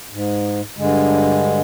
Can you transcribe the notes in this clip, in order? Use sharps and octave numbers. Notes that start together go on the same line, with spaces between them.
G#2
G2 D3 G#3